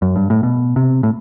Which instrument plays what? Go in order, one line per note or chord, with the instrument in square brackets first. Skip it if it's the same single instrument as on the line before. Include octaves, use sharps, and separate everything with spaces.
[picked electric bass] F#2
G2
A2
B2
C3
A2